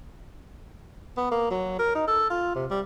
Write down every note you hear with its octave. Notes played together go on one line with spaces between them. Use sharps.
B3
A#3
F#3
A#4
D#4
A4
F4
C3
G3